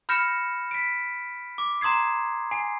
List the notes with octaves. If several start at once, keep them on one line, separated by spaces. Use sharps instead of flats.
B5 F6 G6 A#6 C#7 E7
B6 D7
D6
A#5 C6 D#6 G#6 C7
G#5 C7